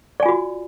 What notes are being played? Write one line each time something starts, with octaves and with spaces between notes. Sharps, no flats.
F4 F#4 D5 G#5